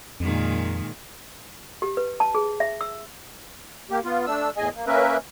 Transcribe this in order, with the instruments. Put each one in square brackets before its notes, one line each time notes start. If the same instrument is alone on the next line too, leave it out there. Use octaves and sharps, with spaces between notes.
[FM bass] F2 [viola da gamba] A#2 D#3 G#3
[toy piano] G4
B4
A5
G#4
E5
E6
[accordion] A#3 G4
B3 F4
A3 D4 E6
E2 A2 G#4 D#5 G#5
A#3
A#3 C#4 A#4 B4 E5